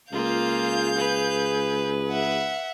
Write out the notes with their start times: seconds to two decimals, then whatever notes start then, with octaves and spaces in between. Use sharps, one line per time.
0.12 C#2 A#3 F4 G#4 F5 G6
0.97 B4
2.09 E5 F#5